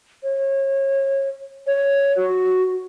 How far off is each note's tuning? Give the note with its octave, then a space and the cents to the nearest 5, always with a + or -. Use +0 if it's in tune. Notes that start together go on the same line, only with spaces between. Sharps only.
C#5 -30
C#5 +5
F#4 +0